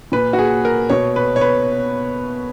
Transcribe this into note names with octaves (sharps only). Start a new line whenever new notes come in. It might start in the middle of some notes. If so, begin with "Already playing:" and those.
A#2 B4
F#4
G#4
A#4
B2 C#5
B4
C#5
B4